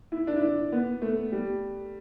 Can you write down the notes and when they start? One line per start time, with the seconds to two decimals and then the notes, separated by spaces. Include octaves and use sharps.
0.12 E4
0.27 D4
0.36 E4
0.42 D4
0.72 B3
1.02 A3
1.32 G3